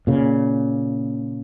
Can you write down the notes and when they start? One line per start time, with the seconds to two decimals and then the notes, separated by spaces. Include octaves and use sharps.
0.07 A#2 C#3